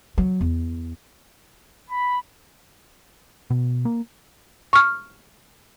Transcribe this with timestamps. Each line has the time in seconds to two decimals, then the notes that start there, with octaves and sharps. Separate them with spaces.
0.18 F#3
0.41 E2
1.90 B5
3.50 B2
3.85 A#3
4.73 C#6 F6